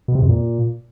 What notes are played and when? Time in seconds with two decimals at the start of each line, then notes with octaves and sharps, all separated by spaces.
0.08 B2
0.15 C3
0.22 F2
0.29 A#2